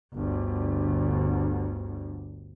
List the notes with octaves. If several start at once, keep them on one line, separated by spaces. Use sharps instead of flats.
G1 D2